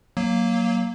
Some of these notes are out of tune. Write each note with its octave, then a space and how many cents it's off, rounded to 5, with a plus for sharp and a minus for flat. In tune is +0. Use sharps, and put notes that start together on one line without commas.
F#3 +0 A#3 +0